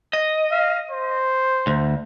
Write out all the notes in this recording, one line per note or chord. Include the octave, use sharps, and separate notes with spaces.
D#5
F5
C5
D2